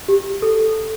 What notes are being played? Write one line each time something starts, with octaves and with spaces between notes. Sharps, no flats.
G4
A4